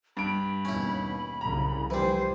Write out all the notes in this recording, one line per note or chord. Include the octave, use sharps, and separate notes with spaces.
G2 B5 D7
D#2 B2 C#4 E4
C2 C#3 F#3 A#5
F1 C2 E3 G3 C5